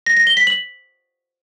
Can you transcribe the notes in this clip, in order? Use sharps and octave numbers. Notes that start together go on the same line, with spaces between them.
A#6
A#6
G7
B6
F#7